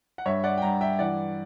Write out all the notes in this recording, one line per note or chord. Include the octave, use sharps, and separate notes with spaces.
F#5
G2 C#5 E5
D5 F#5
G5
G2 F#5 A#5
E5 G5
E3 D5 F#5